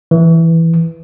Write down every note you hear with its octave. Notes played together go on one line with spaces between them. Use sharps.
E3